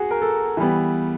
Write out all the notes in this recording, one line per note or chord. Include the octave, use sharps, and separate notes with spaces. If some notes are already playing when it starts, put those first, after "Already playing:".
Already playing: F#4 G#4
A#4
A4
E3 G3 B3